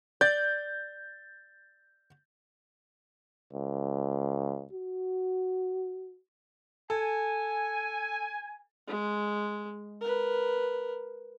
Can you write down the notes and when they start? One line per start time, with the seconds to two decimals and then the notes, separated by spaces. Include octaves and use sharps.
0.21 D5 G6 A6
3.53 C#2
4.73 F#4
6.90 A4 G#5
8.87 G#3
10.01 A#4 B4